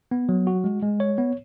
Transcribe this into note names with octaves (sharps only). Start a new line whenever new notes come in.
B3
F#3
F#4
G#3
G#3
C#5
B3